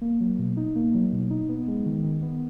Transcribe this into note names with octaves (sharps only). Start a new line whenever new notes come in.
A#3
F#3
B2
D#4
A#3
F#3
B2
D#4
B3
G#3
D#3
D#3
B3